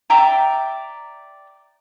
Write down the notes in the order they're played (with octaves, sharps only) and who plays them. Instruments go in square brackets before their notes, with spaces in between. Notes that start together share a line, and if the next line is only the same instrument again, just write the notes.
[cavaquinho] D5 E5 G5 A#5